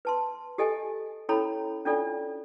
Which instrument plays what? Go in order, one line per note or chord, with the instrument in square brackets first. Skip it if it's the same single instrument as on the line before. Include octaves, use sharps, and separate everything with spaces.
[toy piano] B4 A5 C6
G4 A4 D#5 G#5
C#4 E4 A4 C#5 A#5 B5
C#4 D4 F4 A4 D5